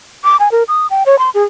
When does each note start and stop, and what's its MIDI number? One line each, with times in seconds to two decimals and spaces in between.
0.24 0.37 86
0.40 0.51 80
0.52 0.63 70
0.68 0.87 87
0.90 1.03 79
1.06 1.18 73
1.19 1.30 84
1.34 1.44 68